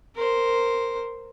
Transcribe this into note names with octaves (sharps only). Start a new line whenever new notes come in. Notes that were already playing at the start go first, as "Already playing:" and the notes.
A#4 C5